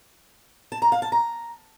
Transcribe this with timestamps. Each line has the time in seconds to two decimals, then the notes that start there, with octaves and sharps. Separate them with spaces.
0.72 A5
0.82 A#5
0.92 F5
1.02 A5
1.12 A#5